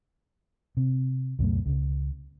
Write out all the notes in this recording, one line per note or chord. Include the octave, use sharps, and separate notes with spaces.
C3
C#2 F#2 B2 A3
C#2 C#3